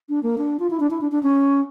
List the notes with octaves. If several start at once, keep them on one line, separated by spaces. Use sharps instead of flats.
D4
A#3
D4
F4
E4
D4
E4
D4
D4
C#4